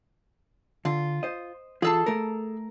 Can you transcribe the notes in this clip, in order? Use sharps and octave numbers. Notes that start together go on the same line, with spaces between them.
D3 F4
C5 D#5
E3 F4 G#4 A4 A5
A3 A#4